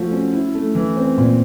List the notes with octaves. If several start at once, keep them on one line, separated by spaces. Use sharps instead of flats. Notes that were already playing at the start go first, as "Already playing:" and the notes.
Already playing: F3 A3 F#4
C#4
E4
A3
E3
C4
A#2